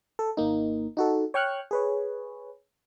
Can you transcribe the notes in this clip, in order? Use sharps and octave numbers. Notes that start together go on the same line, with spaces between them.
A4
G#1 A#3 D#4
D#4 F#4 A4
C#5 G5 C#6 F6 F#6
G#4 B4 C#5